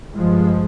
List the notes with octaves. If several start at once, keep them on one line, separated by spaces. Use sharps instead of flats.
G2 F3 G#3